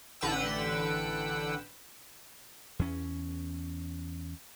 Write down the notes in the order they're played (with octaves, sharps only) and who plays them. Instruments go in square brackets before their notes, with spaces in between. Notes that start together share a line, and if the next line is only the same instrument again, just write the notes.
[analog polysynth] A1 D3 B4 F#5 G5 E6
[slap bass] E2 C#4